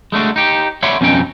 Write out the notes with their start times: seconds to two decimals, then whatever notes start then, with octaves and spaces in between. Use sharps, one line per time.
0.12 G#3 A3 D4 F#4
0.36 D#4 G4
0.83 C#5 D5 E5 F#5 B5 C6
1.01 F2 B2 C#4 D#4 G5